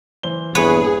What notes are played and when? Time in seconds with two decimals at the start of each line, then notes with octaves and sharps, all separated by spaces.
0.23 E3 C5 G7
0.55 A#1 E2 G2 G#4 B4 C#5